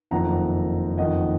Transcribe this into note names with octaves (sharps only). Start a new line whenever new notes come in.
F#1 F2 D#3 F#5 A#5
F#1 F2 D#3 D#5 F#5